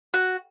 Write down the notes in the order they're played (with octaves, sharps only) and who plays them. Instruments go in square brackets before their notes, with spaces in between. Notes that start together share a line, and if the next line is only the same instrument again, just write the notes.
[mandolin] F#4